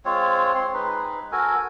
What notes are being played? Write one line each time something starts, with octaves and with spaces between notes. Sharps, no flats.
G#3 C4 F4 C#5
C4 C6
G#3 D#4 B4
F#4 A4 A#4 G#5